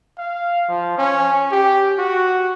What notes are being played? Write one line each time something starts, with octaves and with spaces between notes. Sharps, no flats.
F5
F3
C#4
G4
F#4